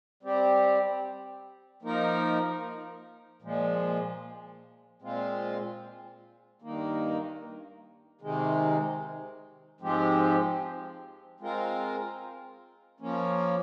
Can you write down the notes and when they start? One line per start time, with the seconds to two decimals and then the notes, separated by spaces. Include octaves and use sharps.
0.23 G3 C4 G4
1.82 F3 A#3 D#4 A#4
3.42 A#2 F3 G#3
5.02 A#2 G#3 C4 F4
6.62 G2 D#3 A#3
8.21 C3 D#3 G#3
9.80 G#2 F3 G#3 C4 G4
11.40 G#3 C4 F4 A#4
13.00 F3 A#3 C#4